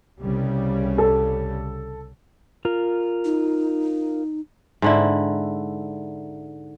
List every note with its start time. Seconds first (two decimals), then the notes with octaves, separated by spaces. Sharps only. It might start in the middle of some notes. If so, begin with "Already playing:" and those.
0.19 C2 C#3 G3
0.98 A4
2.65 F4 A#4
3.25 D#4
4.82 G#2 D3 E4